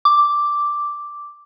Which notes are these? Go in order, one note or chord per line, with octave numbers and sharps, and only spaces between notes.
D6